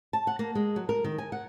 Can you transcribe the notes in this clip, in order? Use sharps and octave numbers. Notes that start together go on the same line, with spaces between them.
A5
F#5
A#3
G#3
F#3
A#4
D#3
G#5
F#5